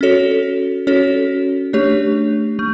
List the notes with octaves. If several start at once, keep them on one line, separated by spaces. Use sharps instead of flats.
C#4 F#4 A4 C#5
C#4 F#4 A4 C#5
A3 D4 G4 C#5
A3